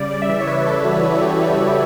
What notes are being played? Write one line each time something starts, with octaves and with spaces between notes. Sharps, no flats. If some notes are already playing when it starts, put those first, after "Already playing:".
Already playing: C#3 G3 D5
C#3 D5
E5
E3 D5
C#5
C#3 B4
G3 A4
C#3 F#4
E3 E4
F#4
C#3 G4
G3 A4
G4
C#3